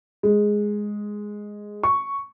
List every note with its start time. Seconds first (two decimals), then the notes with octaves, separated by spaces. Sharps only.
0.23 G#3
1.84 C#6